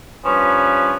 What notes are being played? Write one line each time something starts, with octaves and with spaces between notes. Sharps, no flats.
G2 F3 C#4 B4